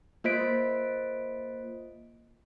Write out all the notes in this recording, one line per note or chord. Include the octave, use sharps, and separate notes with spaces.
A#3 F4 C5 D#5 B6 D7